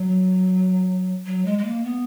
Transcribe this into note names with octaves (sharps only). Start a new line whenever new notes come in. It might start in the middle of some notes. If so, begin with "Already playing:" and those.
Already playing: F#3
F#3
G#3
G#3
A#3
B3